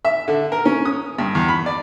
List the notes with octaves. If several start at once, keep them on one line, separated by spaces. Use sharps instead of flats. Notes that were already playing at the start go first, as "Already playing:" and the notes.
E5
D3
A#4
C#4
D#6
G2
E2
B5
D5